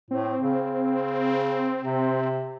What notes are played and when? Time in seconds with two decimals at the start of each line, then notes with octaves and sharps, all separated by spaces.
0.11 A2 C4
0.41 C#3
1.84 C3